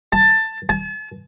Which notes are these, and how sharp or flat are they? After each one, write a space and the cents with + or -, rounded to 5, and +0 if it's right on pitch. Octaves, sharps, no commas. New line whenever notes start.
A5 +15
A5 -40